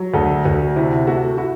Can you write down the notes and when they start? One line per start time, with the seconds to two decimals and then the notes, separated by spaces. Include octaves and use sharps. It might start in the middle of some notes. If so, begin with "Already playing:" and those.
Already playing: F#3
0.14 D2 A4
0.45 D2 F#4
0.76 C3 E4
1.07 A3 F#4
1.38 E4 F#4